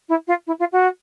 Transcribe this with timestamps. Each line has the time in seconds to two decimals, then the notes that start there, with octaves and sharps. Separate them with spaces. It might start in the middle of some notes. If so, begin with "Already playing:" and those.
0.09 E4
0.27 F4
0.47 E4
0.59 F4
0.72 F#4